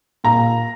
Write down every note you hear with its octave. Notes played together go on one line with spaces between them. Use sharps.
A#2 A#5